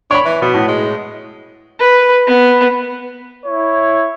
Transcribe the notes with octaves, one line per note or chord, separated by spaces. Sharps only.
D4 C#5 B5
E3
B2 B3
A2
G#3
B4
B3
E4 C#5